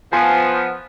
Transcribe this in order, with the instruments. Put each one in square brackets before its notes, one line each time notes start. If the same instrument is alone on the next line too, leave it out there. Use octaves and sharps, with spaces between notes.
[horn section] F3 B3 [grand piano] G#5 C6